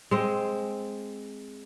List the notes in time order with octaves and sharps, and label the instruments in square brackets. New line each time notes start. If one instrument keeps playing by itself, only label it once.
[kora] G#3 C4